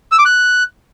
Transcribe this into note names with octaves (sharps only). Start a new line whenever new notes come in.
E6
D6
F#6